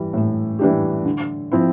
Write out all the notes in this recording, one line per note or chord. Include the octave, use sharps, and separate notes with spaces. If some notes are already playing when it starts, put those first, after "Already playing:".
Already playing: E3 G3
A2
E3 G3 D4 G4
D3
F3 C4 E4